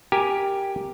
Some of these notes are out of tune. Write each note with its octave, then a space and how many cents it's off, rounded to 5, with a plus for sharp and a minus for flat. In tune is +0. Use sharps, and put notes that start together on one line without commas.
G4 +0 A#4 +0 G#5 +0